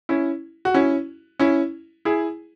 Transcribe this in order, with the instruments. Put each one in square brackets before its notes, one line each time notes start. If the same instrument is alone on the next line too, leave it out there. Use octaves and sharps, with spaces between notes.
[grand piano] C#4 E4
F#4
C#4 E4
C#4 E4
E4 G#4